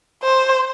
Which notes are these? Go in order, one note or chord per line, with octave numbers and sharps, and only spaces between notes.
C5